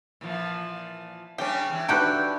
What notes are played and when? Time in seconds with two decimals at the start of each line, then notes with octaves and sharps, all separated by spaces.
0.21 A#2 E3 F3
1.38 C#3 G3 C#4 D4 G4 G5
1.70 E2 E3
1.89 D4 D#4 F#4 G4 B4 F#6 G6 D7